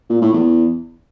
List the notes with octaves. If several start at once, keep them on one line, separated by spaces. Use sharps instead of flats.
A#2
A2
E2